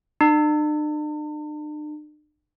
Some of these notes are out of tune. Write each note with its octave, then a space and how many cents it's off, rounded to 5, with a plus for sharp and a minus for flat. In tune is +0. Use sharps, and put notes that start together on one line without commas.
D4 +45